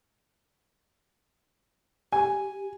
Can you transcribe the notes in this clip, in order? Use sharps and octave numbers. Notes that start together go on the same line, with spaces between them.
G4 G#5